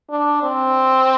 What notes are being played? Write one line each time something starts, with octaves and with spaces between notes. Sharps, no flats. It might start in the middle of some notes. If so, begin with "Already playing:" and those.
D4
C4